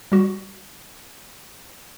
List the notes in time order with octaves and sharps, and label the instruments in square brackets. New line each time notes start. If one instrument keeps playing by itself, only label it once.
[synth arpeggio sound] G3 F#4